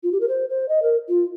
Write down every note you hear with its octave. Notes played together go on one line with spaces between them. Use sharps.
F4
G4
A#4
C5
C5
D#5
A#4
F4